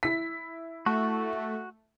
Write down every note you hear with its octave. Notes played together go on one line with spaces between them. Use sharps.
E4 B6
A3 F#4